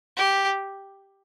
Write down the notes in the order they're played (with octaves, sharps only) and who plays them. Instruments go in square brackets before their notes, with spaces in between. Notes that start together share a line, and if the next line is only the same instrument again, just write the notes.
[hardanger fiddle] G4